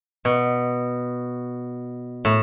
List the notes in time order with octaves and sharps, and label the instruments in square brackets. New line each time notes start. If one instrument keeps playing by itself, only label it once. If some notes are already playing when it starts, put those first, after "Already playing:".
[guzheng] B2
A2